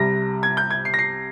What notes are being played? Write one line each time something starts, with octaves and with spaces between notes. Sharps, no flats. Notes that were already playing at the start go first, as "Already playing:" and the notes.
Already playing: C2 C3 G3 A#6
G#6
G6
G#6
C7
A#6
C7